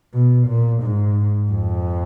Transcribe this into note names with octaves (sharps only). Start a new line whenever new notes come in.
B2
A#2
G#2
F2